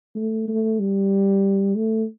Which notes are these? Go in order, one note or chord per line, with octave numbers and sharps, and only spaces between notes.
A3
A3
G3
A3